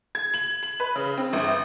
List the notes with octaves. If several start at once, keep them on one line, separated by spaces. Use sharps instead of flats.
G#6
F#7
F#7
B4
C#3
C4
G1